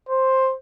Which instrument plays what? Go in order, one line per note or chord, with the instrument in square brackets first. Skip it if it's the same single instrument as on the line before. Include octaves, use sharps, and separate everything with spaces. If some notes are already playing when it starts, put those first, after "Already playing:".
[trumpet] C5